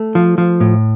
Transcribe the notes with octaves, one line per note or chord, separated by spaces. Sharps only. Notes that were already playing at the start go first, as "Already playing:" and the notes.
Already playing: A3
F3
F3
A2